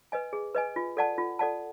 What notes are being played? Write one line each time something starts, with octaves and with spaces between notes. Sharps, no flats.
B4 D#5 G#5
G#4
B4 D#5 G#5
F4
A4 D5 F#5 A5
F4
A4 D5 F#5 A5